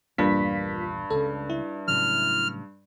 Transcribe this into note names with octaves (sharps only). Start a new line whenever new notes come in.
A#1 E2 G2 A#3 F4 B6
C#2 C#3 A4
E4
A2 C#3 F#3 F6